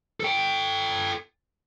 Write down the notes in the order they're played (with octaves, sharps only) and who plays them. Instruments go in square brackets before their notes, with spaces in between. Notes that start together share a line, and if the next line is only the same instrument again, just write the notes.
[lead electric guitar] A4 G5